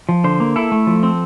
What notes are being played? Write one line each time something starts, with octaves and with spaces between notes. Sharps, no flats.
F3
D3 C5
A#3
E4 A4
A3
F3
C4